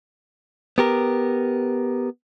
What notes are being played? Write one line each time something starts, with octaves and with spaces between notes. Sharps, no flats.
B3 G4 A#4